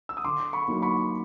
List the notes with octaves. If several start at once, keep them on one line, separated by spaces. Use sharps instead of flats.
E6
D#6
D3 C6 D6
B5 C#6
F#3 A#3 D#4
B5 C#6